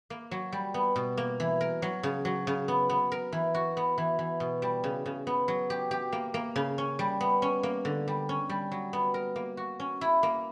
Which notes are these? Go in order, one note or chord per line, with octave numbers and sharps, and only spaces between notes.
A#3
F#3
G3
B3
B2
A#3
E3
A#4
F#3
C#3
F#3
C#3
B3
B3
A#4
E3
F#4
B3
E3
E3
B2
G3
C#3
C#3
B3
F#3
G4
G4
A#3
A#3
C#3
C#4
G3
B3
C#4
A#3
D3
G3
C#4
G3
F#3
B3
A#4
A#3
F#4
C#4
E4
A#3